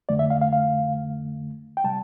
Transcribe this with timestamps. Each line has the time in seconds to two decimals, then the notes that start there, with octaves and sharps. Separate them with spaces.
0.09 F2 D3 A3 D5
0.19 E5
0.30 F5
0.42 F5
0.53 F5
1.77 G5
1.84 C3 G3 A5